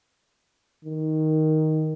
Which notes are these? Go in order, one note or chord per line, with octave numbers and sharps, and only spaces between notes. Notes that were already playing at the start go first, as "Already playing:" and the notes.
D#3